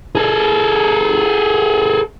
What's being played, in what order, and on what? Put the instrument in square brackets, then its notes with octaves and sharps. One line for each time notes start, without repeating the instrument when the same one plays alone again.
[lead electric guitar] G#4 A4